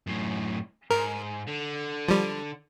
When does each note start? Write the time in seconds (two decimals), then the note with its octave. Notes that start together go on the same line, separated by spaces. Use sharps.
0.07 F#2 A2
0.91 G#2 A#4
1.48 D3
2.08 F3 G3